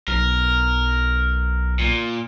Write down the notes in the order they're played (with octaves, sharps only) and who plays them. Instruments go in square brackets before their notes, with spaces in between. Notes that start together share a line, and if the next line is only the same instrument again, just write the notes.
[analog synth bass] B1 [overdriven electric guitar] A#4
[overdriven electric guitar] A#2